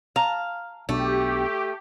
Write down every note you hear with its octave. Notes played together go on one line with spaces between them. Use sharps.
F5 A5 A#5
B1 B2 A3 D4 G4